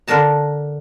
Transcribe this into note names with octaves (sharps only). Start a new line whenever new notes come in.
D3 D4 A#4 A5 A#5